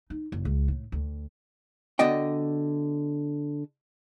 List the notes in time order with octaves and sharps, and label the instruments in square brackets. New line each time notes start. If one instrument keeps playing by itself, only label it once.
[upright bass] D#4
F#1
C#2
A2
D2
[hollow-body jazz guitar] D3 B3 F#4 D5 D#5 G5